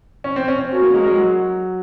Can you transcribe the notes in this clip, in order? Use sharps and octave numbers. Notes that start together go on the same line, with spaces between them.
C#4
C4
C#4
C4
C#4 F#4 A#4
A#3
G#3
G#3
F#3